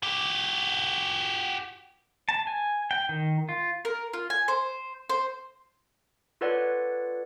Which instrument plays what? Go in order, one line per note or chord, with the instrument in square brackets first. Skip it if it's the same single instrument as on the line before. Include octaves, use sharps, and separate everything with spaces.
[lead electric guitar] F#4 G4
[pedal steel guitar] A5
G#5
G5
D#3
F4
[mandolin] A#4
F4
G#5
C5
C5
[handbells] F4 A4 B4 C#5 D5 F#5